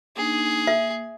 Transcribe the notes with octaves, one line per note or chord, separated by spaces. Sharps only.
A#3 D4 D#4 G#4
A#3 E5